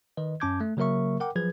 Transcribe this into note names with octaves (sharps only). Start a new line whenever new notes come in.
D#3 B4 D#5
F#2 C#4 A5 D6 G6 G#6
A3
C#3 F#3 A#3 A#4 E5 C#6
A#4 F#5 G5 D6
F3 F#3 G#4 B4 G#6